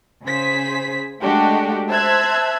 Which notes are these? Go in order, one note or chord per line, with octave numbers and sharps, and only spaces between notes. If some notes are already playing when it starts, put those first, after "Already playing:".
C#3 G#4 C5 B6
G#3 A3 D4 F#4 G4
C5 E5 A5 E6 F#6 G#6